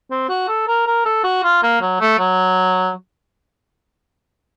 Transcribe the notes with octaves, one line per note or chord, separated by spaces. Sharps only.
C4
F#4
A4
A#4
A#4
A4
F#4
F4
A#3
F#3
A3
F#3